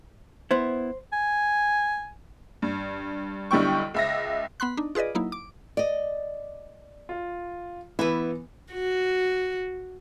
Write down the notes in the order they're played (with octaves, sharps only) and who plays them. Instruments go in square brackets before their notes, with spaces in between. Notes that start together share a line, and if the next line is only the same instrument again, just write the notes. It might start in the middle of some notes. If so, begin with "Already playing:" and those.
[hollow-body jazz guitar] B3 E4 [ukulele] C5
[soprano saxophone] G#5
[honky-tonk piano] G2
B1 D3 G3 E4 G5 C#6
C#2 E5 A#6
[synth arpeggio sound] B3 B5 C6 F#6
D4 D#4
F4 G#4 B4 D5 D#5
F#3 A#3 D#4 E4
D6
[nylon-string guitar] D5 D#5
[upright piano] F4
[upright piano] E3 B3 [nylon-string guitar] E4 B4
[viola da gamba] F#4